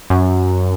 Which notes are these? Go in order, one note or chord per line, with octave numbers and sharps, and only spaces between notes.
F#2